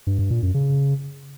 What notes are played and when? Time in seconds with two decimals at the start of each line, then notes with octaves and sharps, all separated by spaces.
0.07 G2
0.19 G2
0.31 A#2
0.42 F#2
0.54 C#3